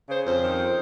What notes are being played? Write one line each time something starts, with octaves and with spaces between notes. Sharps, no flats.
C#3 C5
F2 C5
D#3